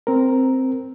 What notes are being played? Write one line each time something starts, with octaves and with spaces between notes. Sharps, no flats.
C4 A#4